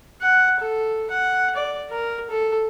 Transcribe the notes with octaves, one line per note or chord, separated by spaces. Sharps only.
F#5
A4
F#5
D5
A#4
A4